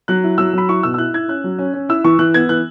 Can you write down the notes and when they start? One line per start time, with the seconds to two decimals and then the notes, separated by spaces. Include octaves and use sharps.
0.08 F#3 F#6
0.24 E4
0.38 F#3 E6
0.53 F#3 B5
0.68 E4 C#6
0.83 B2 E6
0.94 E6
0.98 E4 F#6
1.13 E4 G#6
1.28 C#4 F#6
1.44 F#3
1.59 C#4
1.74 C#4
1.89 E4 E6
2.04 E3 C#6
2.19 E3 F#6
2.34 B3 G#6
2.49 E3 F#6